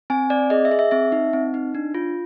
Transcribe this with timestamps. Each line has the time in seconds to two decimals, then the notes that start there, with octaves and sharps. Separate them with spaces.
0.10 C4 G#5
0.30 C4 D5
0.50 G#4 D#5
0.65 E5
0.71 G#4
0.79 E5
0.91 C4 E5
1.12 D#4
1.33 C4
1.54 D#4
1.75 D4
1.94 F4